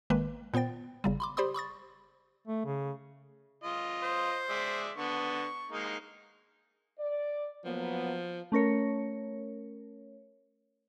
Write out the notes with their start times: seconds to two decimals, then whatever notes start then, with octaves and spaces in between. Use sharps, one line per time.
0.10 G#1 D#3 G#3 A#3 B4
0.54 A#2 B3 C5 G5 A6
1.04 G1 C#3 G3
1.20 B5 C6 D6
1.37 G4 C5 D5 B5 C6 D#6
1.54 B5 C#6 D#6 A6
2.47 A3
2.65 C#3
3.64 F4 D#5
4.02 C5
4.50 G#3 D5 E5
4.97 D3 B3 C#6
5.71 G#3 A#3 D#4
6.99 D5
7.65 F3 F#3 A#3 B3
8.52 A3 C#4 A#4 C#5